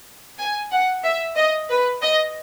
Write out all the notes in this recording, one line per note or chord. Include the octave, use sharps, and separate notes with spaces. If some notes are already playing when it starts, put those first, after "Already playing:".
G#5
F#5
E5
D#5
B4
D#5